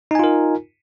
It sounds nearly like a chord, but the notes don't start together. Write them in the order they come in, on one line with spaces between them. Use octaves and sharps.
D#4 G#5 F4 A#4